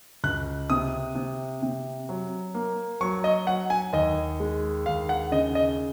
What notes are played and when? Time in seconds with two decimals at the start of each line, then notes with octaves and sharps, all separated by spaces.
0.24 C#2 F#6
0.70 C3 D#6
1.15 C3
1.62 C3
2.09 F#3
2.54 A#3
3.01 F#3 C#6
3.24 D#5
3.47 F#3 F#5
3.70 G#5
3.93 D#2 D#5
4.40 G#3
4.86 D#2 F5
5.09 F#5
5.32 C#3 D#5
5.55 D#5